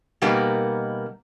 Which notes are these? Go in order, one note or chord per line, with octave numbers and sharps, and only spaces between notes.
B2 G3 A#3 B3 D#4 A#4